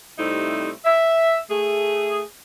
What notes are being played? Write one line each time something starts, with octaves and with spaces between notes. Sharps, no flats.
C3 G3 A3 C4 D#4 E4
E5
A3 G#4